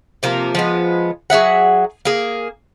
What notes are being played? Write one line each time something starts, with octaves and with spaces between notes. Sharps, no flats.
C3 F3 A#3 A#4
F3 G#3 B3
F#3 G#4 E5 F#5
A#3 G#4